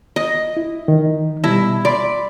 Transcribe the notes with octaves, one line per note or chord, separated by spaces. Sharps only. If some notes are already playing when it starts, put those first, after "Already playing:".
D#5
E4
D#3
B2 G3 E4 A5
D5 B5 C6